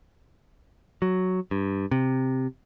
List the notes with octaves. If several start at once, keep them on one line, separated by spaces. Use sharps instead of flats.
F#3
G2
C3